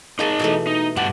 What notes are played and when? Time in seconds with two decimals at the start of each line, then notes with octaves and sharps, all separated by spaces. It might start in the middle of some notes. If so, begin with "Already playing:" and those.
0.19 A#3 D#4 G#4 D#5 A5
0.39 B2 E3 A3
0.67 D#4
0.97 G2 G4 F#5 A5